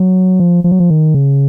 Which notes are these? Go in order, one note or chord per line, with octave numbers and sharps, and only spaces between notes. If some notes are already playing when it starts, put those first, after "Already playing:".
Already playing: F#3
F3
F3
F#3
F3
D#3
C#3